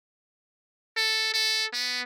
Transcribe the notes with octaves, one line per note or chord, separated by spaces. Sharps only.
A4
A4
B3